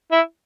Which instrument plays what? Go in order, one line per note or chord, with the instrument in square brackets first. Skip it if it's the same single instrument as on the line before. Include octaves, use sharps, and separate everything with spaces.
[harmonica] E4